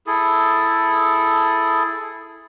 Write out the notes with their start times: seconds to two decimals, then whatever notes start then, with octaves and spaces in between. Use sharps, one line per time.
0.07 E4 G#4 A4